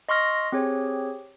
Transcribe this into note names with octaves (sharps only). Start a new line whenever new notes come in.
D#5 C6 C#6 F6 A#6
C4 G4 G#4 C#5